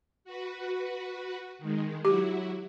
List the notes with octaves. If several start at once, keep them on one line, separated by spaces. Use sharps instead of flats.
F#4 B4
D#3 G#3
F#3 E4 F#4 G4